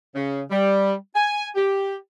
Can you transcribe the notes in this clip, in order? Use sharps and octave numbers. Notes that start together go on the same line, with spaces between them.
C#3
G3
G#5
G4